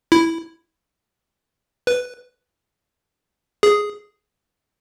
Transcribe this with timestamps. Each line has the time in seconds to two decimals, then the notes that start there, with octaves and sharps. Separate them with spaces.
0.12 E4
1.87 B4
3.63 G#4